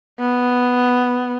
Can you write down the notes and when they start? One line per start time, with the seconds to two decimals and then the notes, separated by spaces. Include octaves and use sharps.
0.20 B3